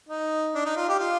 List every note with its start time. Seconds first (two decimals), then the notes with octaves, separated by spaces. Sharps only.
0.09 D#4
0.54 D4
0.65 D#4
0.76 F4
0.88 G4
0.99 F4